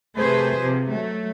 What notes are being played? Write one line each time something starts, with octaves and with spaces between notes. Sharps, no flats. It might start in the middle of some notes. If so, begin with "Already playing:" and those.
C3 A3 G#4 B4 C5
C3 F3
F#3 A3